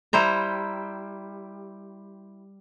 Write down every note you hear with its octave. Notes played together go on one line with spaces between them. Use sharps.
G3 E4 C5 A#5